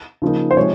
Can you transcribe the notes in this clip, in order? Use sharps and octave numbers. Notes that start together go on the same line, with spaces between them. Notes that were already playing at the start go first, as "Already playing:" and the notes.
C#3 F3 A#3 D#4
C5
C3 F3 G#3 C#5